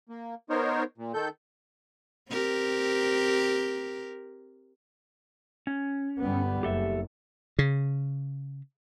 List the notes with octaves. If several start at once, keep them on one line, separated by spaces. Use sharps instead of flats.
A#3
B3 D#4 A#4 C5 C#5
A#2
D#3 A4 G6
C4 G4 A#4
C#4
G1 G3 B3
F#1 G4 A4 E5
C#3